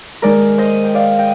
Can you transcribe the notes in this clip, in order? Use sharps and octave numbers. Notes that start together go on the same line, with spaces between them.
D#3 G#3 D#4 A#4 D5
C5 D#5
G5
D5 F5
D#5 G5